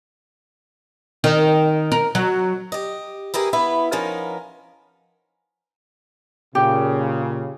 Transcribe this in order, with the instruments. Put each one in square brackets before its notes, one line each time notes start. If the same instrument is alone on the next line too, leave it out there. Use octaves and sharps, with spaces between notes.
[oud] D#3
A#4
F#3
[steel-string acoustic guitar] G4 D#5
E4 G4 G#4 A#4 B4
B3 E4 B4 E5
F3 B3 C#4 D#4 A#4
[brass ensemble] A#2 C#3 [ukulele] G4